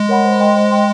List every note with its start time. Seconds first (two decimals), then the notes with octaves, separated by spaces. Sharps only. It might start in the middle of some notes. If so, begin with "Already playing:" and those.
Already playing: G#3
0.09 A#4 C#5 F#5 B5
0.24 C5
0.40 D#5 G5 C6
0.56 C5
0.71 D#5 G5 C6